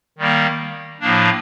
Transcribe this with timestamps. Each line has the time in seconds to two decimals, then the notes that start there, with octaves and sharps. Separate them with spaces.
0.18 D#3 G3 A#3
1.00 A2 F3 A#3 D4